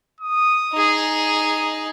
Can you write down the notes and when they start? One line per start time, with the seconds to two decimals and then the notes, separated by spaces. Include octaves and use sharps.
0.21 D#6
0.73 D#4 G#4